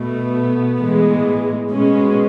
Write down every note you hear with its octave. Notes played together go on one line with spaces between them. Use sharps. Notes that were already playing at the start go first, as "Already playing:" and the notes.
Already playing: B2 A3 B3
A2 E3 G#3
B2 G#3 C#4